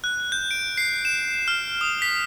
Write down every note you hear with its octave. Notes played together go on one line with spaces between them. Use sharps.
F#6
G6
D7
C7
E7
F6
D#6
B6